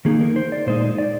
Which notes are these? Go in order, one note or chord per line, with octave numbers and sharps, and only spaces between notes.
D#3 A#3 D#4 G#4
A#4
C5
D5
A#2 G#3 D#4 C5
D5